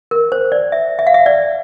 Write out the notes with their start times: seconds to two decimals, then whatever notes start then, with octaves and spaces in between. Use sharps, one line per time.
0.11 A#4
0.32 C5
0.52 D5
0.72 E5
0.99 E5
1.07 F5
1.14 E5
1.26 D5